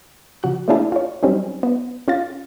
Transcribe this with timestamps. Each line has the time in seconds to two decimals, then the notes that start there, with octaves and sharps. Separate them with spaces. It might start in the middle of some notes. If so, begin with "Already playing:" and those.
0.43 C#3 F3 F#4 F#6
0.68 A3 A#3 C#4 D4 E4 G#4
0.92 F4 C#5
1.23 F#3 G3 C4 C#4 D#4
1.63 B3
2.08 C#4 F4 F5 A6